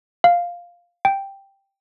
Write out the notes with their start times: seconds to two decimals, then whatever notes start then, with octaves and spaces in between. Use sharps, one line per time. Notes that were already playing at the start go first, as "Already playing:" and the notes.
0.24 F5
1.05 G5